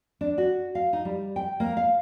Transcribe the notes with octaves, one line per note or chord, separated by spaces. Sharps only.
D4
F#4
F5
D#4
G3
G5
A#3
F5